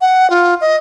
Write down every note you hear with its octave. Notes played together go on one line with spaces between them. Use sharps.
F#5
F4
D#5